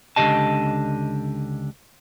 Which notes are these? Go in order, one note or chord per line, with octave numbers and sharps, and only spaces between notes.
C#2 G2 D3 G4 D#5 A5